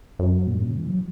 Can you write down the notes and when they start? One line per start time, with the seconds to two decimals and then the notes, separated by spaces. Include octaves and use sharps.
0.19 F#2
0.47 A#2
0.54 G2
0.61 A#2
0.69 C#3
0.78 E3
0.87 F#3